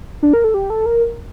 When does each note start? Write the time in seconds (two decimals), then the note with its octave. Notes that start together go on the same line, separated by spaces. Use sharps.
0.23 D4
0.33 A#4
0.44 A4
0.54 G4
0.70 A4
0.86 A#4